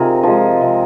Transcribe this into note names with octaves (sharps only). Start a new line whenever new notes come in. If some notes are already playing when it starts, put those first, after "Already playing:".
Already playing: C3 D#4 F4 G#4 A#4
F3 G#3
C3